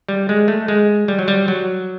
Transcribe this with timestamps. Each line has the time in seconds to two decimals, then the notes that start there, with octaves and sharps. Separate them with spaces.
0.09 G3
0.29 G#3
0.48 A3
0.68 G#3
1.08 G3
1.19 F#3
1.28 G3
1.48 F#3